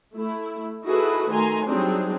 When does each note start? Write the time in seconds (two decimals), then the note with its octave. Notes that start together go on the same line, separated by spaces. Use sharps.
0.14 A3 E4
0.84 D#4 E4 F#4 G#4 A4 B4
1.30 D#3 A3 G#5 A#5 C6
1.65 F#3 G3 C4 D4 D#4 G#4